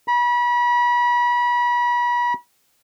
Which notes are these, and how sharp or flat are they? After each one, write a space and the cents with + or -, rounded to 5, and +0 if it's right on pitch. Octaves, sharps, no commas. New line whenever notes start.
B5 -35